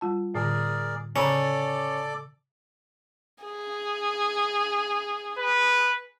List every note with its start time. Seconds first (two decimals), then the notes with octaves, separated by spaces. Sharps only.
0.01 G3 F4 A5
0.35 A2 D3 G#4 A#4 D5 A#6
1.16 C#3 C#4 A4 D5 A#5 B5 D6
3.44 G#4
5.38 B4